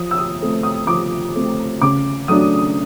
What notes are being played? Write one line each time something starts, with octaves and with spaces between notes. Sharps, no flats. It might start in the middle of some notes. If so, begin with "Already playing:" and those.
Already playing: F3 D#6
E6
D#6
A3 C4
D#6
F3 D6
A3 C4
C#3 D6
F#3 A3 D4 D#6